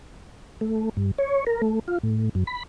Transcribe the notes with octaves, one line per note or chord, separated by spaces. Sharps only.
A3
G2
C#5
A#4
A3
F4
A2
F#2
B5